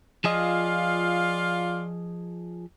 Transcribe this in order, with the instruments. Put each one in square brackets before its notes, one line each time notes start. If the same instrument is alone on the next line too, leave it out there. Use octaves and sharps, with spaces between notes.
[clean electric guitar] F3 G#4 D#5 [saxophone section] F4 D5 F5